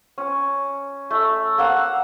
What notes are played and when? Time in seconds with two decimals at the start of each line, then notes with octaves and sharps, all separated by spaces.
0.18 C#4
1.11 A3
1.58 A#3 F5 F#5 E6